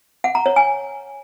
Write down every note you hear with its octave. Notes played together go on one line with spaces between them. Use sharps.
F#5
A#5
C#5
G#5